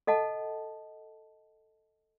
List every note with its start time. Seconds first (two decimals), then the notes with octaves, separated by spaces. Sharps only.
0.07 A4 D#5 F#5 A5